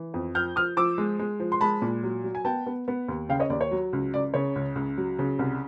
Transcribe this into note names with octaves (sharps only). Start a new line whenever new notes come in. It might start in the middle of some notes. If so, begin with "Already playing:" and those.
Already playing: E3
F2
F3 F6 G6
F3 D#6 F6
F3 D6 E6
G#3
G#3
F3
C6
G#3 A5 B5
A#2
F#3
F#3
G#5
B3 G5 A5
B3
B3
D#2
C#3 F5 G5
C#5 D#5
D#2 D5
C#5
F#3
C#2
C#2 D5
C#3 C#5
C#2
C#2
F#3
C#3
C2